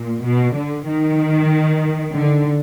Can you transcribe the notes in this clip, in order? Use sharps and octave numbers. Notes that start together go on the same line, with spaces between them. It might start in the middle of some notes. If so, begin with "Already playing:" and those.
Already playing: A#2
B2
D3
D#3
D3